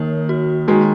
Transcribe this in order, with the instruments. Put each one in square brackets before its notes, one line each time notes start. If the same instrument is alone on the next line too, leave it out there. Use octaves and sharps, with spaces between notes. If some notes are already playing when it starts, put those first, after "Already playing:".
Already playing: [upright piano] D#3 [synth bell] A#3 A#4 C#5
[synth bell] F#4
[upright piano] D#3 G#3 [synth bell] F#4